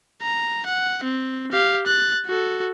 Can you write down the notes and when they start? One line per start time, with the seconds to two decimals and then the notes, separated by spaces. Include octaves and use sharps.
0.22 A#5
0.66 F#5
1.04 C4
1.52 G4 F5
1.87 F#6 A6
2.26 F#4 A4